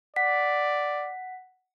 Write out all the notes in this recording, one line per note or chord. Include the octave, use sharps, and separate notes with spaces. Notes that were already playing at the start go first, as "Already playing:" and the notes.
D5 F#5 B6